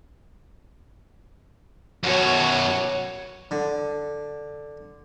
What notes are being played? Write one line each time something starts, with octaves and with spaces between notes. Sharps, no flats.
F#2 B2 F#4 C#5
D3